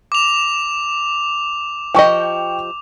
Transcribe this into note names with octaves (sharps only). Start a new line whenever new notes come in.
D6 F7
F3 G4 D#5 G5 C#6